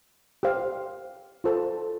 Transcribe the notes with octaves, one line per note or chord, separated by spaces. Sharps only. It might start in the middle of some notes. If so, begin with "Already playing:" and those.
G4 C5 F5
F4 A4 C5 A5